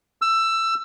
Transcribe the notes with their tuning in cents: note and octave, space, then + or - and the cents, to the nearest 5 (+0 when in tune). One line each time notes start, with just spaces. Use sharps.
E6 +15